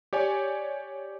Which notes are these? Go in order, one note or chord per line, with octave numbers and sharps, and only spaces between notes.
G4 C#5 D5 G#5